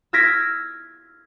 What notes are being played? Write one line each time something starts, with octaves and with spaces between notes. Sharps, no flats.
E6 F6 G#6 A#6 B6 D7